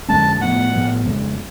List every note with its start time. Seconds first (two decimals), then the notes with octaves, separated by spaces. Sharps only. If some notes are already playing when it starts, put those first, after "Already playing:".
0.08 F2 D3 G#3 C#4 A5
0.41 A2 F3 B3 F#5
0.73 A2 F3 B3
1.06 F2 C#3 G#3